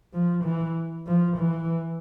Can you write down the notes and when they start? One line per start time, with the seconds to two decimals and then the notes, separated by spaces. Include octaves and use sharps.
0.14 F3
0.45 E3
1.07 F3
1.37 E3